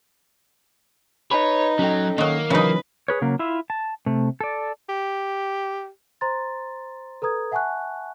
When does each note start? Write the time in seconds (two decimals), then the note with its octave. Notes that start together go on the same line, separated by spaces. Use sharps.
1.31 D#4 B4 C#5 B5
1.79 F#3 C#4 A4 G5
2.18 D#3 F#3 A#3
2.50 C#3 E3 F#3 D#4 B4
3.08 G#4 B4 C#5
3.22 C#3 F#3 A#3
3.39 E4 F4 E5
3.70 A5
4.06 C3 A3
4.40 A4 D5
4.89 G4
6.21 C5 A#5 C6 A6
7.22 A4 B4 A#5 D#6 G#6
7.52 E5 F#5 G#5 A5 C#6 F#6